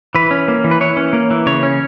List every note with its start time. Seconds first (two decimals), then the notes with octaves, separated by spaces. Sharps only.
0.15 E3 B4
0.31 C#4
0.48 A#3
0.64 E3
0.71 B4
0.81 E3 C#5
0.97 C#4
1.13 A#3
1.31 E3
1.46 C#3 C#5
1.63 C#4